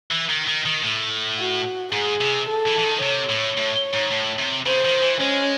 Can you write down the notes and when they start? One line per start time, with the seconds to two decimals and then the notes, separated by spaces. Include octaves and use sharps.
0.11 E3
0.30 D#3
0.48 D#3
0.66 D#3
0.84 A2
1.39 F#4
1.92 G#2 G#4
2.21 C3
2.48 A4
2.66 E3
2.78 E3
2.84 D#3
3.02 C3 C#5
3.29 A2
3.57 A2
3.94 G#2
4.11 A2
4.39 C3
4.66 C#3 C5
4.85 D#3
5.02 E3
5.21 G#3 C#4